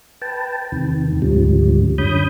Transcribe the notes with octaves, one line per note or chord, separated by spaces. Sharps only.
B4 G5 A5
E2 C3 D#3
D2 G#2 C#3 F3 G3
F#2 D3 C#4 B5 D#6 G6